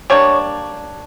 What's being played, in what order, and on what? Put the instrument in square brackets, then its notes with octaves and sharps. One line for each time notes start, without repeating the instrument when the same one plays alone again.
[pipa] G3 A#3 D4 C#5